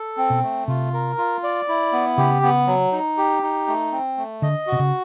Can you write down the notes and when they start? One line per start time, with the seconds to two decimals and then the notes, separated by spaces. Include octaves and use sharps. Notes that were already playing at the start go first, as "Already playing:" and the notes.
Already playing: A4
0.17 C4
0.30 B2
0.43 A3
0.68 C3 F4
0.93 A#4
1.18 F4
1.43 D5
1.68 E4
1.93 B3
2.17 C#3 G4
2.42 B3
2.67 F#3
2.92 D#4
3.17 G4
3.42 D#4
3.68 A3
3.92 C4
4.17 A3
4.42 D3 D#5
4.67 F#4
4.72 C3
4.79 C#3